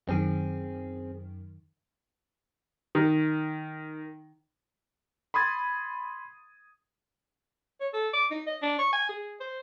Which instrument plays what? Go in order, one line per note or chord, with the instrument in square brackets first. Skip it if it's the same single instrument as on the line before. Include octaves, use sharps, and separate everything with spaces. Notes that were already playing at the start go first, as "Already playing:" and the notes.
[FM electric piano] F#2 D#3 [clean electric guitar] C4 G#4
[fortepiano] D#3
[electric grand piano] B5 C6 D#6 G#6 A6
[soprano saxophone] C#5
A4
D6
D#4
D#5
D4
C#6
G#5
G#4
C5